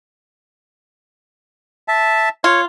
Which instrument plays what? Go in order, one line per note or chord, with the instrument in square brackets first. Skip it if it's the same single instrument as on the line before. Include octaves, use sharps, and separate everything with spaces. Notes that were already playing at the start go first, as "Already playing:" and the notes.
[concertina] E5 A5
[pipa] F4 [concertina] C#5